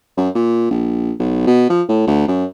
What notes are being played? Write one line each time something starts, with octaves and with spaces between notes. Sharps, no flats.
F#2
A#2
A#1
B1
B2
F3
A2
D2
F#2